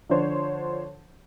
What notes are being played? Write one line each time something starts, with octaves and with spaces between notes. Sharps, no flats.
D3 F3 D4 C5 C#5